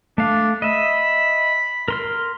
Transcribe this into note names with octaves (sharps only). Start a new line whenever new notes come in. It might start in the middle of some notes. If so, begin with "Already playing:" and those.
A3 D4 F5
D#5 E5 B5
A#4 C6 F6